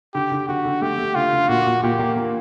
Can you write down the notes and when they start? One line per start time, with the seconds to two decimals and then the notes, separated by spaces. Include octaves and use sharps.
0.14 D3 G4
0.32 D3
0.48 D3 F#4
0.65 D3
0.82 A3 G4
0.98 A3
1.15 D3 F4
1.33 D3
1.49 A#2 F#4
1.66 A#2
1.83 A#2 G4
1.99 A#3
2.16 A#3